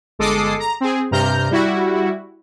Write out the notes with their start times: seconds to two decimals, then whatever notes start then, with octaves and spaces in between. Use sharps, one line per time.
0.19 G1 G#3 A4 D6 D#6 C7
0.60 A#5
0.80 C4 G#4
1.11 G2 C3 A#5 F6 G6
1.51 G3 E4 F#4